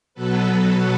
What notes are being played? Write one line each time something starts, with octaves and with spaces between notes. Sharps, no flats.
B2 F#3 B3 A4 B4